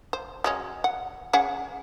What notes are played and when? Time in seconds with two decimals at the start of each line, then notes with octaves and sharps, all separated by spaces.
0.13 C5
0.44 F#3 G#3 C#4
0.84 F#5
1.33 C#4 G#4 F#5